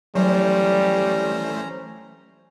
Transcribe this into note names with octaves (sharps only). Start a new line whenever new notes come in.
E3 F#3 G3 A3 C#4 C5 A#5